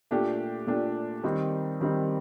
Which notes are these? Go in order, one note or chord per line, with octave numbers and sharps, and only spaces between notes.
A#2 A3 D4 G4
A#2 A3 D4 G4
D#3 G3 C4 D#4
D#3 G3 C4 D#4